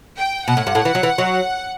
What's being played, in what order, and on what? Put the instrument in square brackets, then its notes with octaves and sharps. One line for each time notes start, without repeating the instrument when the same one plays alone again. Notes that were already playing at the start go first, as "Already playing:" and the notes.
[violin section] G5
[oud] B2 [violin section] F#5
[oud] A2
G2
A2
E3
F#3
E3
F#3